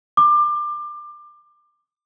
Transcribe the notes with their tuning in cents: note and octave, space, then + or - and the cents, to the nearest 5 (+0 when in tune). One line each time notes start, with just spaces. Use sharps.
D6 +25